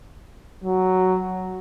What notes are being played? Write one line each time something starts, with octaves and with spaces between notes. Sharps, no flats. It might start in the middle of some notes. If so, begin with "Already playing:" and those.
F#3